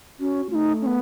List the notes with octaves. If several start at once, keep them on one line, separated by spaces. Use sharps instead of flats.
C#4 F#4
A3 D#4 F4
C#4
B3